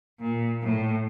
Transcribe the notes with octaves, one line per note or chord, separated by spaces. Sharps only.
A#2
A2